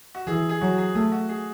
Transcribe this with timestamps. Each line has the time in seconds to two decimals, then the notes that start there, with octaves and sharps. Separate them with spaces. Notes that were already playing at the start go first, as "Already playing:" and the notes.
0.15 F#4
0.27 E3 G#4
0.49 G#4
0.61 F#3 F#4
0.78 G#4
0.95 A3 G#4
1.12 F#4
1.29 G#4